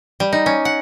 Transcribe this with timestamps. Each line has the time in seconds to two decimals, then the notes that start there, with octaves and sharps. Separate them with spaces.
0.20 G3
0.33 D#4
0.46 C#4
0.65 F#5